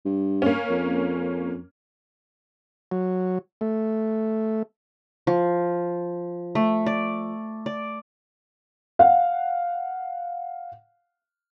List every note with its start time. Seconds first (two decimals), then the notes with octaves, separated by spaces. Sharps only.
0.05 G2
0.42 A#3 C#4
0.70 F2
2.91 F#3
3.61 A3
5.27 F3
6.55 A3
6.86 D5
7.66 D5
8.99 F5 F#5